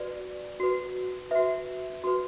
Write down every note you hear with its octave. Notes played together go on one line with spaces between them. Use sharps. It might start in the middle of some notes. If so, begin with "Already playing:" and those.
Already playing: F#4 B4 D5
F#4 B4
F#4 B4 E5
F#4 B4